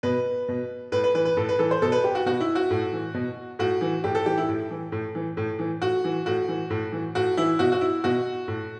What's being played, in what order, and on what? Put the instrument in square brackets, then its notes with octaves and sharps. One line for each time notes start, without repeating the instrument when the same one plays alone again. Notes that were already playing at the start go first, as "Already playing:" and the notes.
[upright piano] B2 B4
B2
A2 B4
B4
E3 B4
B4
A2 A4
B4
E3 A4
C5
B2 A4
B4
G4
F#4
B2 F#4
E4
F#4
A2
E3
B2
A2 F#4
E3
A2 G4
A4
E3 G4
E4
A2
E3
A2
E3
A2
E3
A2 F#4
E3
A2 F#4
E3
A2
E3
A2 F#4
E3 E4
B2 F#4
F#4
E4
B2 F#4
A2